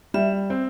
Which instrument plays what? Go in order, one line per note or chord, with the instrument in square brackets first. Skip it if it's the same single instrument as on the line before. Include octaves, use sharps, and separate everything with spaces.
[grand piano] G3 [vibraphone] E5
[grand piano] C4